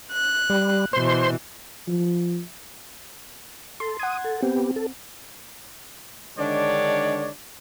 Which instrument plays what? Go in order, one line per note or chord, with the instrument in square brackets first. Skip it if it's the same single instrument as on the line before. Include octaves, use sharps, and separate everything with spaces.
[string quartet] F#6
[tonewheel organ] G3
[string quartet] B2 E3 [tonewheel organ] C5 C6
[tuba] F3
[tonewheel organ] A4 [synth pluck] C6
[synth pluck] F#5 G#6 [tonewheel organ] D#6
[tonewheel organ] A4
[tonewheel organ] B3 G4 [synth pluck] C4
[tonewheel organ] A4
[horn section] D3 D#3 G#3 D4 C#5 D5